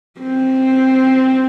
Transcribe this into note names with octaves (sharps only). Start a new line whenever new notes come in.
C4